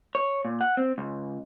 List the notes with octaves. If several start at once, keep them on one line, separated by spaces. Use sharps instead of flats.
C#5
A#2
F#5
C4
C#2